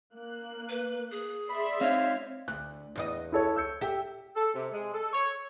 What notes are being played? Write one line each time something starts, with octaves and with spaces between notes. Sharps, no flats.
A#3 F#6
B4
G#4
D5 E5 B5 C6
C4 D#4 C#5 F5
D2 F#6
E2 F4 D#5
E4 A4 C#5
E6 G6 C#7
G4 A4 E5 G5
A4
C3
G#3
A4
C#5